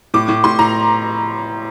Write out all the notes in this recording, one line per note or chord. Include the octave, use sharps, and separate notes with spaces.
A2 D6
A2
A2 C6
A2 A#5